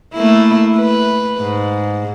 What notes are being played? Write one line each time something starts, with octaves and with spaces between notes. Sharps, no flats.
A3 A#3 E4
B4
G#2